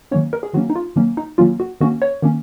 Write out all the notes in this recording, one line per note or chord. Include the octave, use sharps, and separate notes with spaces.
D#3 F#3 A#3 C#4 C#5
A#4
G#4
D#3 F#3 A#3 C#4 F#4
D#4
F4
D#3 F#3 A#3 C#4
D#4
D#3 F#3 A#3 C#4 F4
F#4
D#3 A#3 C#4 F#4
C#5
D#3 A#3 C#4